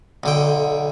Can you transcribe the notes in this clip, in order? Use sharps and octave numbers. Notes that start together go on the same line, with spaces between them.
B1 D3 G5